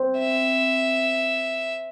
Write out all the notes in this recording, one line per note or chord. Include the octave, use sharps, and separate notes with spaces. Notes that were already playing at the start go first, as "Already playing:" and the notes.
Already playing: C4
E5